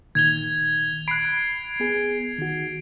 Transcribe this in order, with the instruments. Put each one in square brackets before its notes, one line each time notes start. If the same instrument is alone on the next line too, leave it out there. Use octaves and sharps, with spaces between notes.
[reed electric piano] A#2 D#3 [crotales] G#6 F7 G7
[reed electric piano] B5 F#6 [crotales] C7 D7
[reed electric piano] B3 G#4
D#3 F#4